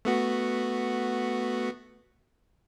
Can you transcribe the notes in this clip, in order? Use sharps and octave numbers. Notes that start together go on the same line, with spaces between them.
A3 B3 F#4